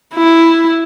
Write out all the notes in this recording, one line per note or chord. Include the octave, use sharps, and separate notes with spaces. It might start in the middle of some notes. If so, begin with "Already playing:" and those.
E4